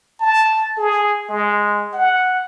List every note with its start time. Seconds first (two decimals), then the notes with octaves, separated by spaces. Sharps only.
0.20 A5
0.78 G#4
1.29 G#3
1.93 F#5